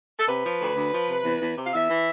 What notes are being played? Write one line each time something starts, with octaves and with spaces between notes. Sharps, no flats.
A4
C3 B4
F3
D2
D2
F3
C3
E2
E2
C3
F5
E2 E5
E3